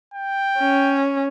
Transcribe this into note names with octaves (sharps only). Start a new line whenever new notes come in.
G5
C#4